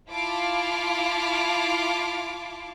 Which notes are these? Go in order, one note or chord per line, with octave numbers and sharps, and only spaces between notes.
E4 F4 F5 A5 D6